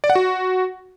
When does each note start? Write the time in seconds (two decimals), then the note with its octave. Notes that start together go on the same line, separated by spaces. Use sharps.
0.04 D5
0.10 F#5
0.15 F#4